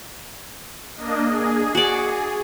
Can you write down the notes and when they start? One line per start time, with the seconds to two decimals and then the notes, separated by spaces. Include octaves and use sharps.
0.97 A#3 D4 D#5
1.26 G#4
1.75 F#4 D5